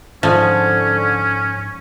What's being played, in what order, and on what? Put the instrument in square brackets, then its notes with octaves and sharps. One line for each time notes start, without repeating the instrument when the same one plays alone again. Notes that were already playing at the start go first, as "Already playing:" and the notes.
[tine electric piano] G#2 [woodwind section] D3 [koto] F3 [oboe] C#4